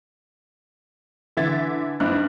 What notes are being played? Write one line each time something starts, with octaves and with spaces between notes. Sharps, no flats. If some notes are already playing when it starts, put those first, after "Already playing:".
D3 E3 E5 G#6 A6
G2 C4 D#4 E4 F#6